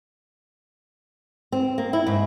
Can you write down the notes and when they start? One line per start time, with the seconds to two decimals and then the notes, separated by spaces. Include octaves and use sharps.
1.52 C4
1.78 A#3
1.93 E4
2.07 G#2